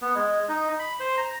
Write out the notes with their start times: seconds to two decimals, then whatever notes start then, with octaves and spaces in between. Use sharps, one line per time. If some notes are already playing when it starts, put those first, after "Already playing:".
0.02 B3
0.15 G#3
0.49 D#4
0.79 B5
1.00 C5
1.17 A#5